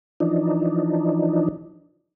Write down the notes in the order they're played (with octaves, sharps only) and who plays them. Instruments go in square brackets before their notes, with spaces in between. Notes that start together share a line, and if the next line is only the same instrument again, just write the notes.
[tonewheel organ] E3 F3 D4 D#4